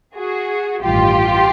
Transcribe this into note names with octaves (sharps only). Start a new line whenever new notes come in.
F#4 G#4
A1 G2 D#3 F4 G4